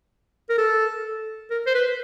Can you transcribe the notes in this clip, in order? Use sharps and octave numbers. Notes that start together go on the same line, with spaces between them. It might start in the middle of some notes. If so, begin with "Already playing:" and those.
A#4
A4
A#4
C5
B4